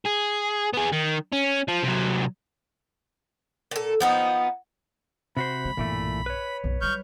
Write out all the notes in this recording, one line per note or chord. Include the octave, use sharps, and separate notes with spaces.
G#4
B3 G#4
D#3
C#4
F3
C3 F#3
A#2 A4
F3 B3 D#4
C3 F#4 C5 B5
G#3
B1 G2 A#2 E3 A3
B4 C#5
B1 F#2
F#3 G3 C#6 F6 G6